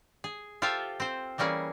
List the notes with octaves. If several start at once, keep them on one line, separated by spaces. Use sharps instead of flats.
G#4
F4 G4 A4 C5 E5 F5
C4 C5
E3 G3 A#3 C#4 G#4